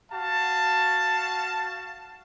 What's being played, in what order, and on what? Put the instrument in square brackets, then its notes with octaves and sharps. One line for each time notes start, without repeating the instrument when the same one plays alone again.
[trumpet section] F#4 F5 A5